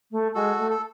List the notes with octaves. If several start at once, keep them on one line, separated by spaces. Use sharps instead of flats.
A3
G#3 F#4 A4
A3
A4